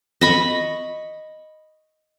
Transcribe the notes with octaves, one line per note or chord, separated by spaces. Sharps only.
D#5 B5 C#6